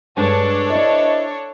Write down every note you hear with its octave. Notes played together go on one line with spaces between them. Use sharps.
G2 G#3 D4 A4 C#5
E4 B4 C5 D5 D#5